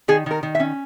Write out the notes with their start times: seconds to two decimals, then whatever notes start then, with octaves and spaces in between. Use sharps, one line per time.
0.08 D#3 G#4
0.26 D#3 A#4
0.43 D#3
0.55 E5
0.60 C#4